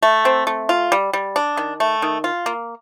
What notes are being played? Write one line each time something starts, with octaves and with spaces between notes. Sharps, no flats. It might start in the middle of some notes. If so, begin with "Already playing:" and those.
A3
C4
A3
F4
G3
G3
D4
D#3
A3
D#3
F4
A#3